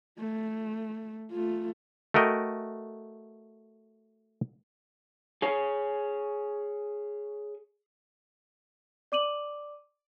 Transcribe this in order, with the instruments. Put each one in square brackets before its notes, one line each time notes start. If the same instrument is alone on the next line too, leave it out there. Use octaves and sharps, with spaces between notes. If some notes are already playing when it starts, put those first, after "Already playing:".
[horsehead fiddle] A3
A3 F4
[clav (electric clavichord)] A3 F#4 A#4 D#5 G5
[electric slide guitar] G#4 C#5
[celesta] D5 D6 D#7 F#7